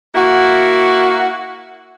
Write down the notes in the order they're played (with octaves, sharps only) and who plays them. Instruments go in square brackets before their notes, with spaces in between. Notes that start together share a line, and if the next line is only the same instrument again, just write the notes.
[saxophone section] A#3 E4 F#4